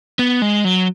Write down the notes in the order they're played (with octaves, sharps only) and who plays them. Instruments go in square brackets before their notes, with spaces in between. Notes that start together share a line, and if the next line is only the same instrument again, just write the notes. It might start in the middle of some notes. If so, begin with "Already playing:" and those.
[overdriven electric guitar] B3
G#3
F#3